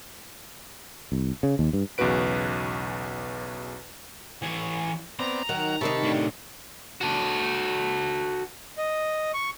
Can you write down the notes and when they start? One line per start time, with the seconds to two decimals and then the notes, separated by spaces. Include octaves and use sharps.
1.12 C2
1.43 C#3
1.59 D#2
1.73 G2
1.98 B1 E2 C#3 F#4 B4 D7
4.42 E3 C#5
5.19 B3 C4 D5 A#5
5.49 D#3 F#3 F#5
5.81 C3 D#3 D#4 A5 B5 C#6
6.04 A2 D4
7.01 F#4 A4
8.78 D#5
9.34 C#6